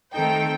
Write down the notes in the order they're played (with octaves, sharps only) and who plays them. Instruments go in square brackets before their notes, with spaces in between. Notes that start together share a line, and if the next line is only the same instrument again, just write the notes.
[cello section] D#3 A3 C4 D#4 A4 [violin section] G5